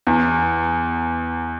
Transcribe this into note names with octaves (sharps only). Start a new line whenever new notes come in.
E2